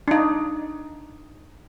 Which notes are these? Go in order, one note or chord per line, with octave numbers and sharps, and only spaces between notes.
D4 D#4